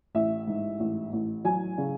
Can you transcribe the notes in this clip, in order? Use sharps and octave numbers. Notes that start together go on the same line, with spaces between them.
A1 E5
G#2
A1
A1
F#3 G#5
C#3